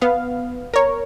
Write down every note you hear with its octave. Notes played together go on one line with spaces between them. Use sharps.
B3 F5
A#4 C#5